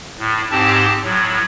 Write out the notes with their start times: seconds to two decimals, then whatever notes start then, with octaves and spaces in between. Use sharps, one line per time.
0.19 A2
0.51 G#2 C4 G4 A5
1.04 A2 F#3